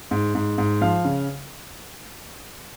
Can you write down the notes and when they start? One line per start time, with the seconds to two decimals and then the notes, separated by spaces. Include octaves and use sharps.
0.11 G#2
0.35 G#2
0.58 G#2
0.81 F3 F5
1.05 C#3